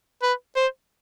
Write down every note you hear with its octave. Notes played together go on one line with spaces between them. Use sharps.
B4
C5